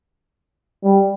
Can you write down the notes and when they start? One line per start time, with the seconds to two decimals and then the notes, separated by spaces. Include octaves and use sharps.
0.85 G3